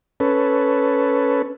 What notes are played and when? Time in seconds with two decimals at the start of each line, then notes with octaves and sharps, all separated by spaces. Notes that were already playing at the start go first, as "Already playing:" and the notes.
0.20 C#4 A4 B4